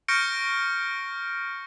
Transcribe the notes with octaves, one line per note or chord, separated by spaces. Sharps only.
C#6 F6 G6 A#6 C#7 D7